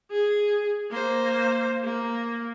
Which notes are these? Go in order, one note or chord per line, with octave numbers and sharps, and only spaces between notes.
G#4
A#3 C5
A#3